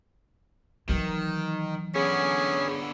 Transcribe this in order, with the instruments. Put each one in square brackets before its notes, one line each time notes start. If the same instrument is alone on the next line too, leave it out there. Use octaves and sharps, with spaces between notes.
[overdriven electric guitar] D#3 [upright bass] E3 F#3
[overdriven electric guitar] D3 B3 [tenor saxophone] C#4 [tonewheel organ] G#4